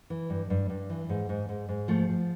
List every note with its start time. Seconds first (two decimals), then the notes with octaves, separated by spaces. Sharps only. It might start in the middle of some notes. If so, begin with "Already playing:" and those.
0.10 E3
0.30 G2
0.50 G2
0.70 G2
0.90 E3
1.09 G#2
1.29 G#2
1.49 G#2
1.69 G#2
1.88 F3 A3
2.08 F3